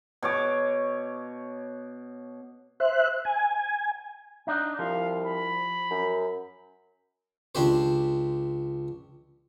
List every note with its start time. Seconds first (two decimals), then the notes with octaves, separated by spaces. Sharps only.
0.23 B2 C#5 D6
2.80 C5 E5 F#6
3.25 G#5
4.47 D4 D#4
4.79 C2 F3 F5
5.27 B5
5.91 F#2
7.55 C#2 D4 G4 C5